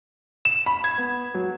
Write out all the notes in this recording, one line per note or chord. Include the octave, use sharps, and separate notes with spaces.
E7
B5
G#6
B3
F#3